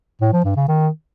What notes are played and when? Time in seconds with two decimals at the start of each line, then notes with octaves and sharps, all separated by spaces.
0.21 A2
0.33 F3
0.45 G2
0.56 C#3
0.68 D#3